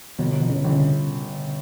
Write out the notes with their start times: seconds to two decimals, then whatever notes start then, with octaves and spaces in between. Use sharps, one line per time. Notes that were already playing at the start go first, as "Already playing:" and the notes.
0.19 G1 B2
0.41 G1
0.50 C#3
0.58 D3
0.64 G1 C#3
0.79 C#3